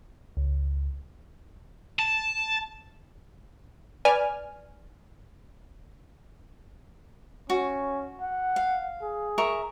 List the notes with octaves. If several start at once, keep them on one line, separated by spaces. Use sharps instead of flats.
C#2
A5
B4 D5 G#5 F6
C#4 F#4
F#5
F5
G#4
A#4 E5 C#6